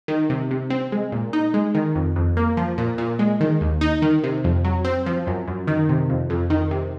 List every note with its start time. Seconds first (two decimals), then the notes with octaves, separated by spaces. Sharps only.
0.08 D#3
0.30 C3
0.51 C3
0.70 C4
0.92 G#3
1.12 A#2
1.33 D#4
1.54 G#3
1.75 D#3
1.95 F2
2.16 F2
2.37 A#3
2.57 F3
2.78 A#2
2.98 A#2
3.19 G#3
3.41 D#3
3.61 D#2
3.81 D#4
4.02 D#3
4.24 C3
4.44 F2
4.64 F#3
4.85 C4
5.06 F3
5.27 F#2
5.48 F#2
5.67 D#3
5.89 C3
6.10 F2
6.30 F2
6.50 D#3
6.71 C3